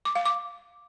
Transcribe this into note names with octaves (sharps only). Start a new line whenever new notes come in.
D6
F5
D6